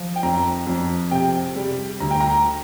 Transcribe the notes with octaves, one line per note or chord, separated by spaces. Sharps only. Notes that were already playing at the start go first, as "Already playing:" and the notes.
Already playing: F3
G5
F2 A#5
F2
C3 G5
G3
D2 A#5
G5
A#5